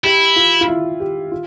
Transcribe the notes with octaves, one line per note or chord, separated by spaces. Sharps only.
E4 G4
F4
F4
E4
G4
F4